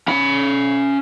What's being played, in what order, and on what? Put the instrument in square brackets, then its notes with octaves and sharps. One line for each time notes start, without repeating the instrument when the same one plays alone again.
[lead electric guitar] C#4 B5